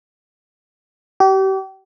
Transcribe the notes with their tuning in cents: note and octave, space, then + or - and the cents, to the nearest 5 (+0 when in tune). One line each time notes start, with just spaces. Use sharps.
G4 -35